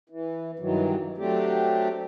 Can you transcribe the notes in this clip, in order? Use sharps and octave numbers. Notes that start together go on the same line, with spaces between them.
E3
G2 D#3 E3 F#3
F#3 A3 C4 D4 G4